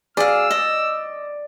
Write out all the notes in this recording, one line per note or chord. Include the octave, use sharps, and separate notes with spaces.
G#4 D5 F5 E6
D#5